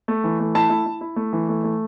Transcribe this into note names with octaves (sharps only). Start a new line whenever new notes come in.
A3
E3
A3
E4 A5
E4
E4
E4
A3
E3
A3
A3